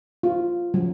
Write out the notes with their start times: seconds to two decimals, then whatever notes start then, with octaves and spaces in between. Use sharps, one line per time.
0.23 F4
0.74 F#3